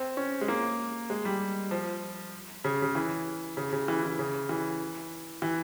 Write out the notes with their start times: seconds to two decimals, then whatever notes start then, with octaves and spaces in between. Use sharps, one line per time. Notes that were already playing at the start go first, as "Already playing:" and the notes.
Already playing: C4
0.17 C#4
0.41 G#3
0.48 A#3
1.10 G#3
1.25 G3
1.71 F3
2.64 C#3
2.82 C#3
2.95 E3
3.57 C#3
3.73 C#3
3.88 E3
4.03 E3
4.19 C#3
4.49 E3
5.42 E3